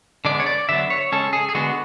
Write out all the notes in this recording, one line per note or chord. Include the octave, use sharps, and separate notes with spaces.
D3 G#3 B3 D5
C#5
D5
D3 F#3 B3 E5
C#5
C#3 G#3 C#4 A4
G#4
G#4
D3 G#3 B3 F#4